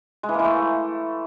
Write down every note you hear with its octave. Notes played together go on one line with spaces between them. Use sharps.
G#3
E3
A#3
E3
A3